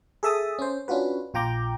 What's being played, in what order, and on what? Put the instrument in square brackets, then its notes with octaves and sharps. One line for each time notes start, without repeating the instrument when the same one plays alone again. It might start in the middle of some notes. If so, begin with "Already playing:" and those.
[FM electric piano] G#4 A4 E5 A5 D#6
C#4 C5
C#4 D4 F4 F#4 B4
A#1 F4 G5 A#5 D6 G6